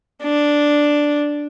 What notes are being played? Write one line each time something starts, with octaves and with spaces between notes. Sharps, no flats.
D4